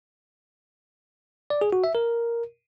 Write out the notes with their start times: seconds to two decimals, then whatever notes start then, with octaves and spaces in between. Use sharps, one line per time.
1.50 D5
1.61 G#4
1.73 F#4
1.84 E5
1.95 A#4